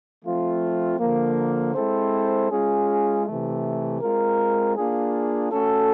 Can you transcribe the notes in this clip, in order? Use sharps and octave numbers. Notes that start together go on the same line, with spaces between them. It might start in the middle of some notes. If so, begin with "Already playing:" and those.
F3 A3 C4 F4
D3 F3 A#3
G#3 C4 E4 A4 C5
G#3 C#4 F4 G#4
C3 E3 A3
G#3 C4 F4 A#4
A#3 D4 F4 G#4
A3 C#4 F#4 A4